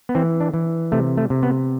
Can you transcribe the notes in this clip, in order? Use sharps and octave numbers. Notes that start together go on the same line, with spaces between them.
B3
E3 C4
D4
E3
C3 A3
A3
C3
B3